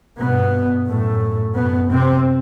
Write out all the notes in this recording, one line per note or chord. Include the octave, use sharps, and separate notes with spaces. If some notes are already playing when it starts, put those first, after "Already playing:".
G2 B2 B3
F#2 A2 A3
F#2 B2 B3
C3 C4